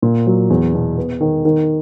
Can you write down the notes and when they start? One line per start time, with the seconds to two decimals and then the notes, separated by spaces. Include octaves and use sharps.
0.02 A#2
0.27 F#3
0.50 E2
0.74 B2
0.98 B3
1.21 D#3
1.45 D#3